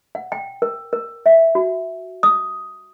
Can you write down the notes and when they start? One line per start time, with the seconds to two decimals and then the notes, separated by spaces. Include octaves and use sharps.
0.15 F#5
0.32 G5
0.62 A#4
0.93 A#4
1.26 E5
1.55 F#4
2.23 D#6